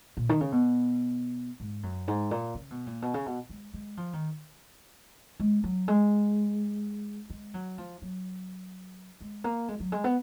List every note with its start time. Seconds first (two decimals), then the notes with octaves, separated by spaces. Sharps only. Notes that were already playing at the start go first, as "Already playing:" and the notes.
0.17 A#2
0.29 D#3
0.41 C#3
0.52 B2
1.60 G#2
1.83 F#2
2.08 G#2
2.31 A#2
2.55 C#3
2.71 B2
2.86 A#2
3.02 B2
3.14 C#3
3.26 B2
3.50 G#3
3.74 G#3
3.97 F3
4.13 D#3
5.40 G#3
5.64 F#3
5.88 G#3
7.30 G#3
7.54 F#3
7.78 F3
8.02 F#3
9.21 G#3
9.44 A#3
9.68 G#3
9.80 F#3
9.92 G#3
10.04 B3